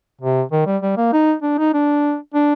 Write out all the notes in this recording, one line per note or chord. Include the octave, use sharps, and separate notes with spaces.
C3
D#3
G3
G3
A#3
D#4
D4
D#4
D4
D4